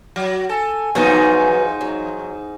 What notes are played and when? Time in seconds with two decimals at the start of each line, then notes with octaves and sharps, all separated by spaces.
0.16 F#3
0.49 A4 G#5
0.95 E2 G#2 F#3 B3 D#4 F#4
1.81 F#3